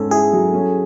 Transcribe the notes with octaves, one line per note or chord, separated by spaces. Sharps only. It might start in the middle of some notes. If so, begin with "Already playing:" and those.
Already playing: G#2 C#4 A4
E4 G#4
F#3
C#4